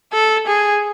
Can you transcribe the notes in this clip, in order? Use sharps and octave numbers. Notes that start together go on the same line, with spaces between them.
A4
G#4